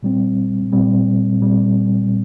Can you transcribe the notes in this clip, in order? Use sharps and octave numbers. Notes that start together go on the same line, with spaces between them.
A#2 G3 C4
A#2 G3 C4
A#2 G3 C4